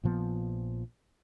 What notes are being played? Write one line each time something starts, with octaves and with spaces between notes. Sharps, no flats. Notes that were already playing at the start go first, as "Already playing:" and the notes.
A#1 A#2 F3 B3